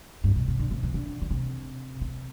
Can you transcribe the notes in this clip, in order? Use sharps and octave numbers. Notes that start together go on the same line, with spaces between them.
G2
B2
C3
D3
C3
E3
D3
D3
C3
C3